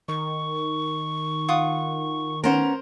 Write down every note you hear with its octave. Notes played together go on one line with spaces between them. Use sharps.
D#3 C#6
F4 F#5 D#6
B3 C#4 A#4 C5 F#5 A#5